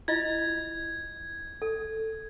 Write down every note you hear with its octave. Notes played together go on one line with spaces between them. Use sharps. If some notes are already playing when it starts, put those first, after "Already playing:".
E4 F4 D#5 G#6
A4